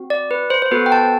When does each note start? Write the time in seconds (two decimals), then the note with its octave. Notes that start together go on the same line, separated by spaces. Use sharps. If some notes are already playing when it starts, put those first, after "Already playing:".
Already playing: C4 F#4
0.10 D5
0.31 B4
0.50 C5
0.62 C5
0.71 B3 F#4 A4 B4
0.86 G5
0.92 A5